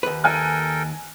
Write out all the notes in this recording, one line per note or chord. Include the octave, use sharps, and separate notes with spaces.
D#2 B4
A4 A#4 G5 G#5 F#6